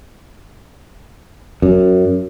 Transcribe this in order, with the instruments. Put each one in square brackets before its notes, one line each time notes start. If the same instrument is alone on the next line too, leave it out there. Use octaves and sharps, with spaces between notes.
[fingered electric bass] F#2